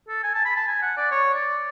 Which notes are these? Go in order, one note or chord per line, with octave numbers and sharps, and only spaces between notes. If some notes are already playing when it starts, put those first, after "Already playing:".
A4
G#5
A5
B5
A5
G#5
F#5
D5
C#5
D5